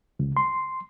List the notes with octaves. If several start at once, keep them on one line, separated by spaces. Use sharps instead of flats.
C#2
C6